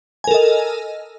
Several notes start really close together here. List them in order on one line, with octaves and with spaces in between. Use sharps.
G#5 A#4 A4 D#5